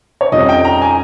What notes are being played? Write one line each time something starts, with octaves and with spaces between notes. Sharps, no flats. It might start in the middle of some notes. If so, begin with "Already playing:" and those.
C#5
F2 D#3 G3 C#4 D#5
G5
A#5
G#5